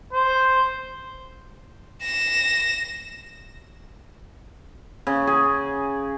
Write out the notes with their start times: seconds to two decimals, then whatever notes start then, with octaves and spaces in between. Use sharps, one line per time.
0.13 C5
2.03 A#6 E7
5.07 C#3
5.27 G#4